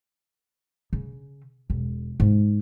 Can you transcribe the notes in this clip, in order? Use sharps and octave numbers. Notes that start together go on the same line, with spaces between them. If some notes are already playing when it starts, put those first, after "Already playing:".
C#3
E1
G#2 C#4